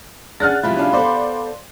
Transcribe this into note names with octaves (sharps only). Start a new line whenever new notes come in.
C#4 D4 G#4 D5 F#5 F6 F#6 A6
C3 F3 G#3 E4 F5 B5
C#4 D4 F4
B3 A4 C5 D5 C6